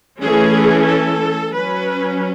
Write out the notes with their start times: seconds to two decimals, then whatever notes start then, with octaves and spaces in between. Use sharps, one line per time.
0.21 E3 A3 C#4 G#4
0.87 A4
1.53 F#3 C#4 B4